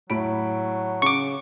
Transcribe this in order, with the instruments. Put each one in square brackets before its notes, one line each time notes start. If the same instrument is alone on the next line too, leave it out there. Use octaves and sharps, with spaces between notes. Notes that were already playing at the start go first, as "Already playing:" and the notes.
[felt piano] A2 B5 D7 [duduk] F#3
[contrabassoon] C#3 [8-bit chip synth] C#6 D6